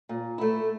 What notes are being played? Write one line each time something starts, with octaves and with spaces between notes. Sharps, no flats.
A#2
A3 E4